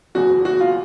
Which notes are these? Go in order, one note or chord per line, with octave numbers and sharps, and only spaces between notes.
F#1 E2 B2 F#4
F#4
F4